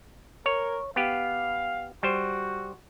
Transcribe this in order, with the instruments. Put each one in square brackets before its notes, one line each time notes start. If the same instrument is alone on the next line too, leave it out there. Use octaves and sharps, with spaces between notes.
[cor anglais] A#4 [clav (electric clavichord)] C#5
[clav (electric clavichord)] B3 G4 [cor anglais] F5
[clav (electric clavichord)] G3 C5 [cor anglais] F#4